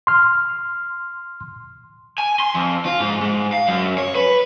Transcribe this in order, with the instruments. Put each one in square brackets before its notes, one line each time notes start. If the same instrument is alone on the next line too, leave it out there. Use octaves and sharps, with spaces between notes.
[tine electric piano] C6 F6
[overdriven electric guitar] G#5
C6
F2
F4
G#2
G#2
F5
F#2
C#5
B4